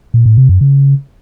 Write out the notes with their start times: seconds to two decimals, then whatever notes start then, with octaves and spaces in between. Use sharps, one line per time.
0.14 A#2
0.26 A2
0.37 C3
0.49 F#2
0.61 C#3